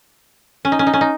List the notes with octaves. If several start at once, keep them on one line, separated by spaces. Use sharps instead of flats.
C#4
D#4
C#4
D#4
C#4
D#4